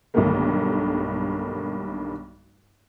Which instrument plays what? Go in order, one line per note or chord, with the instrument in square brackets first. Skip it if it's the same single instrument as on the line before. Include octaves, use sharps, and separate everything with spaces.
[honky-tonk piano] B1 G2 D3 D#3 A3 A#3